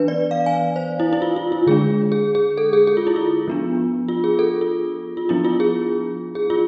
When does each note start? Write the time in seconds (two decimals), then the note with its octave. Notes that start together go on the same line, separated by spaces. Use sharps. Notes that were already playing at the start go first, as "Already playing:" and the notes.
Already playing: E3 B3 D4 B4
0.08 D5
0.31 F5
0.46 G#5
0.76 C5
1.00 E4
1.13 E4
1.22 F4
1.36 F4
1.52 F4
1.67 D3 G#3 D4 G#4
2.12 G#4
2.35 G#4
2.58 A4
2.73 G#4
2.87 G#4
2.97 F4
3.07 E4
3.16 F4
3.48 F3 B3 D4
4.08 F4
4.24 G#4
4.39 A4
4.61 F4
5.17 F4
5.29 F3 B3 D4 E4
5.45 F4
5.60 G#4
6.35 G#4
6.50 F4